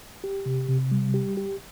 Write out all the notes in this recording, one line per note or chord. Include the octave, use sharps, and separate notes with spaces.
G4
C3
C3
G3
G4
G4